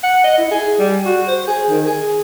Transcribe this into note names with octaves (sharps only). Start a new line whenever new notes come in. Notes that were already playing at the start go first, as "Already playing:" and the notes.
F#5
D#5
E4
G#4
G3
F#4
C5
G#4
D#3
G#4